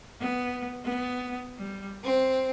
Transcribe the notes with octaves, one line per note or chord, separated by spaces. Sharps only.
B3
B3
G3
C4